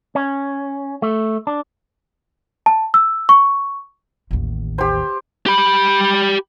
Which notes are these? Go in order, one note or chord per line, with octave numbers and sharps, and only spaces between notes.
C#4
A3
D4
A5
E6
C#6
A1 D#2
G4 C5
G4 B5